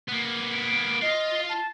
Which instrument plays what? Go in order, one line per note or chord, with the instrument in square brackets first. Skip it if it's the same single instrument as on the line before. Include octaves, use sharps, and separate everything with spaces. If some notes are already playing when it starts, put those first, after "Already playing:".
[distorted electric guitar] A#3 B3
[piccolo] D7
[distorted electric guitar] F4 F5 [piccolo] D#5
[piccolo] A5